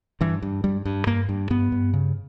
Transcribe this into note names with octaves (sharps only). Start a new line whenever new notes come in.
G2 E3
G2
G2 G3
G2
G2 A#3
G2
G2 B3
G2
C#3